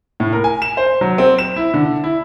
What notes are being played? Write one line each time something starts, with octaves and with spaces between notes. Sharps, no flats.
A2
A#4
G#5
E7
C5
F#3
C4
E7
E4
D3
E4